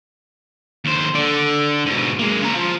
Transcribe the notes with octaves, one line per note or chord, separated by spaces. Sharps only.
D#2 C5
D3 D5
G#2 B2
G#3 A#3
C#3 A#5
F3